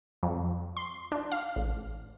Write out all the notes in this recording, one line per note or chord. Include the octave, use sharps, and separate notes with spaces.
F2
C6
D4
F5
A1